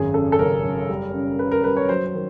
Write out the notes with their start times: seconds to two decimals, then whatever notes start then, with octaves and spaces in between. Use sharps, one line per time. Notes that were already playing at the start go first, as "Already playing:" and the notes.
Already playing: G#1 F#2 G#4
0.14 C#3 A4
0.32 A4
0.39 F#1 A#4
0.64 F#2
0.89 G3
1.14 C#3
1.39 C#3 B4
1.52 A#4
1.64 G3 B4
1.77 C#5
1.89 F#3 C5
2.06 C5
2.14 D#3